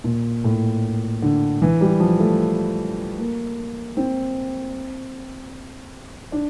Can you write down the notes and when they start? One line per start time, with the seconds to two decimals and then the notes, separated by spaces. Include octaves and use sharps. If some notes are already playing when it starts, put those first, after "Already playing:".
0.04 A#2
0.44 A2
1.22 D3
1.62 E3
1.81 G3
2.00 F3
2.19 A3
3.18 A#3
3.97 C4
6.32 D4